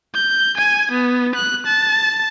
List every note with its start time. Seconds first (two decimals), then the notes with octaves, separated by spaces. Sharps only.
0.15 G6
0.57 G#5
0.91 B3
1.35 F#6
1.66 A5